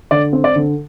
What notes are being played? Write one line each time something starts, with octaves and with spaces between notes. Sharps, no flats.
D3 D5
C4
D5
D3